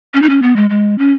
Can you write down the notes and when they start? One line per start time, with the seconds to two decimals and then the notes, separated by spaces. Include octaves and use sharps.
0.14 C#4
0.22 D#4
0.29 C#4
0.42 B3
0.56 G#3
0.70 G#3
0.98 C#4